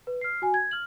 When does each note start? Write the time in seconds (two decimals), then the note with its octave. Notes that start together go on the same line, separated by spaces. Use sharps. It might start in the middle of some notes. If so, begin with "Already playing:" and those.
0.07 B4
0.21 F6 C7
0.42 F#4 G#5
0.54 G#6
0.71 F6 F#7